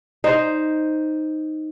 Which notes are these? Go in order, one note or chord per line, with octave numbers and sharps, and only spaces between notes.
D#4 C5